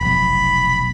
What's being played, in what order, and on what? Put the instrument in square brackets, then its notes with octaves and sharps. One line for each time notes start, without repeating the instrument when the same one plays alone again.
[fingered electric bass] F1 B1 [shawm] B5